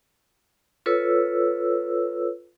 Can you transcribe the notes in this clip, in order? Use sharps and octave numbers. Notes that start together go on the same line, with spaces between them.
F4 A4 B4 C#5 E6